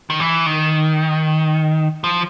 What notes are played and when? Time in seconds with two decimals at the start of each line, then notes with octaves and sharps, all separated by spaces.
0.10 D#3
0.20 E3
0.46 D#3
2.04 F3